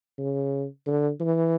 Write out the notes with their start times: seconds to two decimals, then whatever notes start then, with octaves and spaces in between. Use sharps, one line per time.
0.18 C#3
0.87 D3
1.20 E3